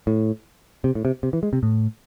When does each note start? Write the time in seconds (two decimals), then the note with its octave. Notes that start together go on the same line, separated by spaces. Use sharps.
0.07 A2
0.84 C3
0.95 A2
1.05 C3
1.23 C3
1.33 E3
1.43 G#3
1.53 C3
1.63 A2